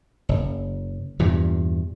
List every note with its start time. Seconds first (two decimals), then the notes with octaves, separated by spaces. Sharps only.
0.29 F#1
1.19 E2 G2 A#2